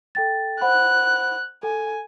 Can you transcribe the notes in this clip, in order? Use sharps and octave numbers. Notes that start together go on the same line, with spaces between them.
A4 G5 A6
C5 F#5 B5 F#6
A4 G#5